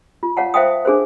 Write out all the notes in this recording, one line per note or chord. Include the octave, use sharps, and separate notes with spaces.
F4
C#5 F5 F#5 A5
C5 E5 F5 G5 A5 D#6
D4 G#4 A#4 C5